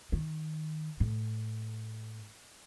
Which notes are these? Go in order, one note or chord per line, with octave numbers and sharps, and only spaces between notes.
D#3
A2